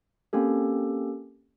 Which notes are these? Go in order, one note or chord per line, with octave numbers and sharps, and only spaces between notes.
A#3 C4 C#4 G4 A4